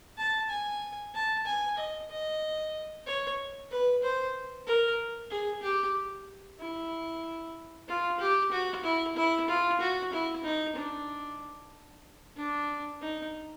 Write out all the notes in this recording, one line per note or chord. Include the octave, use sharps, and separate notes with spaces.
A5
G#5
A5
G#5
D#5
D#5
C#5
B4
C5
A#4
G#4
G4
E4
F4
G4
F#4
E4
E4
F4
F#4
E4
D#4
D4
D4
D#4